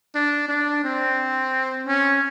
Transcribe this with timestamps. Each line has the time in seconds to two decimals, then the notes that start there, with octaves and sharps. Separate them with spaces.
0.15 D4
0.48 D4
0.84 C4
1.87 C#4